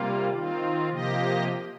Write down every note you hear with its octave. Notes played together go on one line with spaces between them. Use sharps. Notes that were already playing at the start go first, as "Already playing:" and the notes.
Already playing: C3 G3 A#3 F4
D#3 C4 F4
C3 F3 A#3 G4 D#5